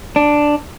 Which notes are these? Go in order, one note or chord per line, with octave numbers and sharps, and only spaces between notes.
D4